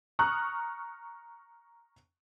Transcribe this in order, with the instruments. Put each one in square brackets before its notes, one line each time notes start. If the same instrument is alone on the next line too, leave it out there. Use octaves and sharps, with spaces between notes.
[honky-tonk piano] A#5 C#6 D#6 F6 F#6